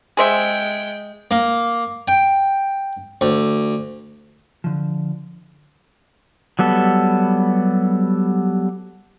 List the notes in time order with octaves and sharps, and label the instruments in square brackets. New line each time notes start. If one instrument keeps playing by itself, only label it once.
[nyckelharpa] G#3 G5 [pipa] G#4 C5 E5
[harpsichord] A#3
G5
D2
[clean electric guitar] D3 F3
[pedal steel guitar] F#3 G3 B3 A4